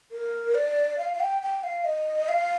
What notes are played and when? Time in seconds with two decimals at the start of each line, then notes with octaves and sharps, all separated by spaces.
0.12 A#4
0.55 D5
0.98 F5
1.14 F5
1.20 G5
1.42 G5
1.63 F5
1.85 D#5
2.29 F5